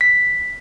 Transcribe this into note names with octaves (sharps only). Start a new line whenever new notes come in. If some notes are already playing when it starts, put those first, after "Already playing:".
B6